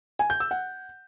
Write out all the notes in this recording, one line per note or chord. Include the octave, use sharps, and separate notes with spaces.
G#5
G6
E6
F#5